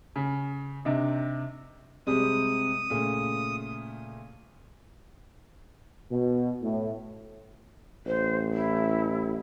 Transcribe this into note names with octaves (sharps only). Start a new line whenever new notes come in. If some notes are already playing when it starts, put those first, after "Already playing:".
C#3
C3 D4 D#4
C3 G3 G#3 D#6
A#2 C#3 A3
B2
A2
A1 C5
E4